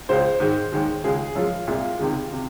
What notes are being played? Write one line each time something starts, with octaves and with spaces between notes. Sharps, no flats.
C#2 C#3 G#3 C5
G#2 D#3 G#3
D#2 D#3 G#3
C#2 C#3 G#3 G#4
F#2 F3 G#3 F4
C2 A#2 G#3 F4
C#2 C3 D#3 G#3
C3